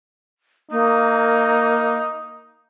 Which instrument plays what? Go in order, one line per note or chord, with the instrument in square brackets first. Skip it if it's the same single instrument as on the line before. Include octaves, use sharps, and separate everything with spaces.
[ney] A#3 [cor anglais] D#4